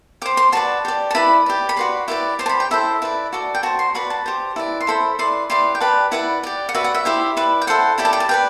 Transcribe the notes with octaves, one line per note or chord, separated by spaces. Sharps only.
G4 C5 D6
C6
F#4 B4 D5 A5
G4 D5
A5
E4 B4 D5 B5
G4 D5
B5
F#4 B4 D5 C6
E4 G4 B4 D5 D6
G4 C5 C6
A5
B5
G5
E4 A4 C5 E5
E4 B4 D5
F#4 A4 D5
G5
F#4 C5 A5
C6
F#4 B4 D5 B5
A5
G4 C5
E4 B4 D5
C6
E4 A4 C5 B5
E4 B4 D5 C6
E4 G4 B4 D5 C6
G5
G4 B4 D5 A5
E4 B4 D5 F#5
G4 D5
F#5
F#4 B4 D5 E5
F#5
E5
E4 G4 C5
E4 B4 D5
G5
E4 A4 C5 F#5
E4 G4 D5 B5
A5
G5
A5
G4 B4 D5 G5